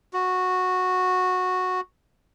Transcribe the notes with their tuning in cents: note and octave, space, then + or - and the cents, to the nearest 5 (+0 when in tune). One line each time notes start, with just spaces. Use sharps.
F#4 -10